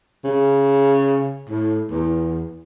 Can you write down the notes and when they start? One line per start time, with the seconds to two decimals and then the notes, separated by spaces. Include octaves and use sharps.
0.24 C#3
1.49 A2
1.90 E2